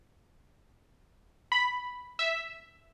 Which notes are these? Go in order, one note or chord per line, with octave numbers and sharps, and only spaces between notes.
B5
E5